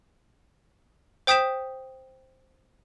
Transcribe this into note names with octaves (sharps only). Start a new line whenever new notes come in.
C5 G5 D#6 G6 B6 E7